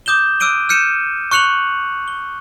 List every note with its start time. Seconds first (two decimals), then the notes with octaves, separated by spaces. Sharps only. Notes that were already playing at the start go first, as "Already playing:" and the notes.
0.06 D6 D#6 G6 E7 G7
0.40 D6 E6 F#6 D7 D#7 G7
0.69 F6 G6 C#7 D#7 E7
1.31 C#6 F#6 C#7 F7 F#7
2.08 G7